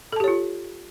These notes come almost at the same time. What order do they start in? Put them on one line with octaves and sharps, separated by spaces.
A4 A5 G4 C#5 F4